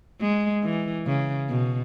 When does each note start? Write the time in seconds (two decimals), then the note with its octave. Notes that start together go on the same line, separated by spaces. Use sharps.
0.21 G#3
0.63 E3
1.06 C#3
1.49 B2